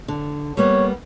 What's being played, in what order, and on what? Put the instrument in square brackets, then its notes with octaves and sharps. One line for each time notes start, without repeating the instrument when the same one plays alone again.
[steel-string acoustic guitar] D3
[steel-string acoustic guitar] G3 A#3 B3 [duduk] C#5